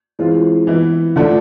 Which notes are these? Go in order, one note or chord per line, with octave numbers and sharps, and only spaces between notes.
E3 G#3 C4 F4
E3 B3 E4
D3 F3 A3 D4